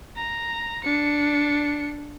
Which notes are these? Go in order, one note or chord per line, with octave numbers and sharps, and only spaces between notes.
A#5
D4 C#7